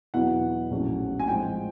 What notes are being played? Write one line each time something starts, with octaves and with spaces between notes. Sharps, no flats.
E2 B2 F#3 B3 E4 F#5
A#1 A2 F#3 A3 C#4
G#5
A2 F3 G#3 C4 G5